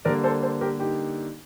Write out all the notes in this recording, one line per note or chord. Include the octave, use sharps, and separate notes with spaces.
D3 G3 A#3 A#4 D5
A4 C5
A4 C5
G4 A#4
D#4 G4